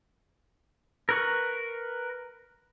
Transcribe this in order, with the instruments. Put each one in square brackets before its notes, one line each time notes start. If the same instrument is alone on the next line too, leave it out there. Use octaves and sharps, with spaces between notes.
[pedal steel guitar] A#4 B4 C#6